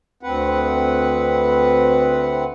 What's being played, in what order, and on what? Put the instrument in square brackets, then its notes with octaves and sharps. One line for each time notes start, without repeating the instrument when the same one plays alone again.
[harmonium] D2 C4 B4 F#5